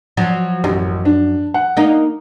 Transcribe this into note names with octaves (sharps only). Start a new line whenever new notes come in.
F3 F#3
A1 F#2
D4
F#5
A#3 D#4